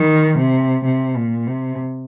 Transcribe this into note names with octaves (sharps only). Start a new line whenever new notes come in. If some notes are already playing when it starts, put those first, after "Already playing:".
Already playing: D#3
C3
C3
A#2
C3